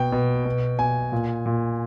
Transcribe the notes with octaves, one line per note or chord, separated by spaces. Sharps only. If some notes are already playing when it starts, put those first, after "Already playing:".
Already playing: B2 G5
B2
B2
B2 G#5
A#2
A#2